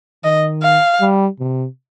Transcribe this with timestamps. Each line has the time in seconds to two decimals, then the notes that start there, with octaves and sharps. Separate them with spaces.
0.24 D#3 D#5
0.63 F5
1.01 G3
1.40 C3